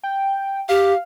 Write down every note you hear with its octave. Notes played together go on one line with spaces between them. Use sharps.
G5
G4 F5